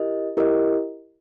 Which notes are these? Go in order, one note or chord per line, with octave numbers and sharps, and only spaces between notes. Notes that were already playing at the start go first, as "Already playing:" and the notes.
Already playing: E4 G4 A#4 D#5
E4 G4 A#4 D#5